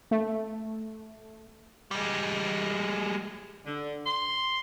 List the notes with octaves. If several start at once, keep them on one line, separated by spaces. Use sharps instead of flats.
A3
G3 G#3
D3
C6